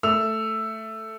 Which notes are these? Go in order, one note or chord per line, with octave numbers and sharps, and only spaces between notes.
A3 E6 F7